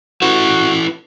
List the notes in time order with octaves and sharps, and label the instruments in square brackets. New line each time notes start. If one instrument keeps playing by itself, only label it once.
[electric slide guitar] E4 A4 B4 [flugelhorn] F#4